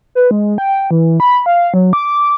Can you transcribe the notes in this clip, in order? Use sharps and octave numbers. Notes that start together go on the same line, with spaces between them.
B4
G#3
G5
E3
B5
F5
F#3
D6